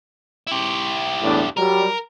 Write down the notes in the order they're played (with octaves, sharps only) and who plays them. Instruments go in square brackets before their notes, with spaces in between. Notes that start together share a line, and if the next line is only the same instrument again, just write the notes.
[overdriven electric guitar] E4 G4
[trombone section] E2 A2 D4
[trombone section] F#3 G3 [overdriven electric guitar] A#4